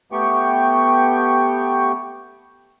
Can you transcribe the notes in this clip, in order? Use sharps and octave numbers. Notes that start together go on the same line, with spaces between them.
A3 B3 G4 G5 C#6